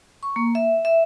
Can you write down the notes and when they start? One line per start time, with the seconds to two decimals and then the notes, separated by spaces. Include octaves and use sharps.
0.23 C#6
0.36 A#3
0.55 E5
0.85 E5